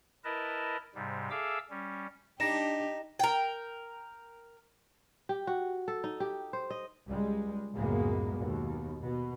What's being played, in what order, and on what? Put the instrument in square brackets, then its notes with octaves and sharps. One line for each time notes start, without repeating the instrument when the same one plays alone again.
[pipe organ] E4 A#4 B4 D#5 A5
G#2 C3 G3
G#4 A4 E5 F5 D6 E6
G3 C#4
[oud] D4 [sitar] D#4 [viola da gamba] G4 [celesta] A#6 E7
[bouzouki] A#4 G5
[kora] G4
F#4
A4
D#4
G4
C5
D#5
[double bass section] C#2 G3 G#3
C#2 F#2 A2 G#3 A#3 B3
D#2 B2
B2